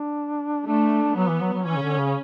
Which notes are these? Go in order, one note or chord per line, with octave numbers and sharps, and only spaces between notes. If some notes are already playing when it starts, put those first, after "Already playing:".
Already playing: D4
A3 D4
F#3 B3
E3
F#3
F#3
E3 C#4
C#3
D3
C#3